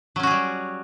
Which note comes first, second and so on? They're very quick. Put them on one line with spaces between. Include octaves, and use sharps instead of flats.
F#3 C#4 F#4 G#4 G3